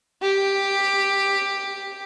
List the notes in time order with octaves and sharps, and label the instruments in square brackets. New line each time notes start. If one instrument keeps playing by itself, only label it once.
[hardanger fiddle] G4